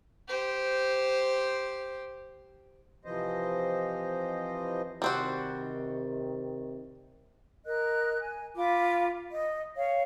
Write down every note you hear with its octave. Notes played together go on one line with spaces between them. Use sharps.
G4 C5
C3 E3 F3 C5 D#5
C3 D#3 G3 C4 F#4
A#4 D#5 F#6
G#5
F4 B5 D6
D#5
C#5 F5